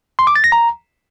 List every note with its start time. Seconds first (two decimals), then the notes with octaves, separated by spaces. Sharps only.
0.19 C6
0.27 D6
0.35 A6
0.44 A#6
0.52 A#5